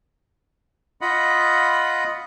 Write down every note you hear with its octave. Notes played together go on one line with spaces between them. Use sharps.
F4 D#5 F#5 B5